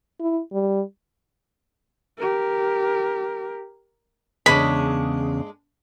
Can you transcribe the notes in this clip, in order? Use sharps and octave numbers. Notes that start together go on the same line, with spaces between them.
E4
G3
G4 A#4
E2 C#3 G#3 D4 B5